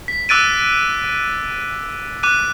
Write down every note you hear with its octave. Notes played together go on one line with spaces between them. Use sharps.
B6
D6 E6 F#6 A6 D7 D#7
D6 F#6 D#7